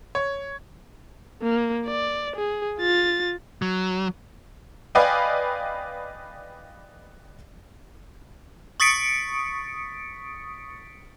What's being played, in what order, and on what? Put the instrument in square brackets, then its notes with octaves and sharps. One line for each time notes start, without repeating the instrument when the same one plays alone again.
[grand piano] C#5
[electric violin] A#3
D5
G#4
F4 A6
[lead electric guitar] F#3
[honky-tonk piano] B4 D5 D#5 F5 G5 G#5
[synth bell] C#6 D#6 A6 B6 C#7 D7